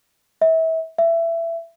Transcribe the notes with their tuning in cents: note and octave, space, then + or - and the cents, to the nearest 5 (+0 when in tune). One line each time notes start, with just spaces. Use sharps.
E5 -30
E5 +20